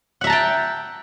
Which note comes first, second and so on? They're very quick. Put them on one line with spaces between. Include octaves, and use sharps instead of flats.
F#5 E5 A#5 A5 G5